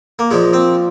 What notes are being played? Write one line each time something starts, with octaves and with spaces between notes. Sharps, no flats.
A#3
A#2 F3 G#3
C4